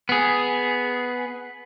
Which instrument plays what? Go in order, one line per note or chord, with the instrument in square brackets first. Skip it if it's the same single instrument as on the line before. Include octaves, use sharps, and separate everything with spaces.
[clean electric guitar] B3 G#4